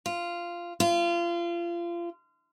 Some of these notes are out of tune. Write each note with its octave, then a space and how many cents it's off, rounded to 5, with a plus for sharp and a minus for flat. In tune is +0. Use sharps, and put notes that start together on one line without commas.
F4 -10
F4 -30